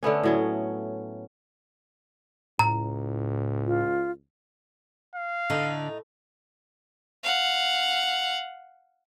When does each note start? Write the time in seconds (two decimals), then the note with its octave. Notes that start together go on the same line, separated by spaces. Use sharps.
0.03 D3 A3 B3 C#4
0.23 A2 F#3 C#4
2.59 C#2 A2 A#5
3.67 F4
5.16 F5
5.50 A2 D3 D#4
7.24 F5 F#5